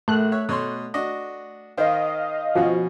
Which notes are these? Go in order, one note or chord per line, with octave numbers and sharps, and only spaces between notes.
A#1 A3 F#6
C#5 E5
B2 C#5 C6
D4 F#4 D#5
D#3 C5 D#5 F5
B2 F3 C#4 F#4